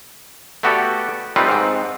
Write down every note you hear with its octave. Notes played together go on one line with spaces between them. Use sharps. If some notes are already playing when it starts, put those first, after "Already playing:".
A3 B3 F#4 G4 A4 D5
G3 A3 C4 D#4 F4 B4
G#2 C4